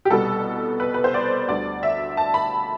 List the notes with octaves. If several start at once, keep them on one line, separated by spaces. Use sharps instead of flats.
G4
C2 B2 G3 B3 A4
B4
B4
C5
D5
D2 D3 G3 D5
E5
A5
B5